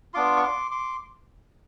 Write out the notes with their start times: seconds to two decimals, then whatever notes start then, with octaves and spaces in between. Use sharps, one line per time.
0.14 B3 D4 F4 C6 D6
0.36 C#6
0.43 C6 D6
0.71 C6 D6